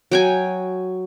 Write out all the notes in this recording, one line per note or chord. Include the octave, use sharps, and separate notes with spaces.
F#3 G5 G#5